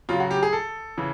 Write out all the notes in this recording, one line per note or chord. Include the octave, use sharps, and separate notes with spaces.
C#3 F#3 F4
F#4
G4
G#4
A4
C#3 E3